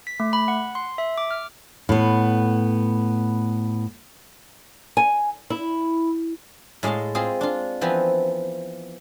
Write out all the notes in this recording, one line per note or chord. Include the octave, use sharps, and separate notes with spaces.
B6
A3
B5
F#5
C6
E5
D6
F6
A2 B3
G#5
E4
A2 G#3 D#5 F5 A5
C4 F4 G#4 D#5
D4 F4
E3 F3 B3 C4